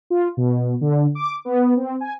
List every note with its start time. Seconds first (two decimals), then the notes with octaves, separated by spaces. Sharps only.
0.10 F4
0.37 B2
0.81 D3
1.15 D6
1.45 B3
1.77 C4
2.01 G#5